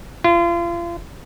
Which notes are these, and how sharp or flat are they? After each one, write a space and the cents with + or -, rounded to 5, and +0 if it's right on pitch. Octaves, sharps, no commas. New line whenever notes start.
F4 -35